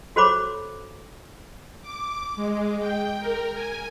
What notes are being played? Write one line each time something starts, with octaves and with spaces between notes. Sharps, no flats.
F#4 A4 C5 C#5 B5 D6
D6
G#3
G5
A#4
G#5